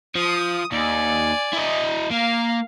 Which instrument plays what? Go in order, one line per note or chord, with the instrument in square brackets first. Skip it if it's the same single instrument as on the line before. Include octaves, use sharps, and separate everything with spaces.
[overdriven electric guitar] F3 [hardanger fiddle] D#6
[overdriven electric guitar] D#2 [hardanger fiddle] D5 G#5
[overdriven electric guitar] E4 D#5
[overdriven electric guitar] A#3 [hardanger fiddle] F5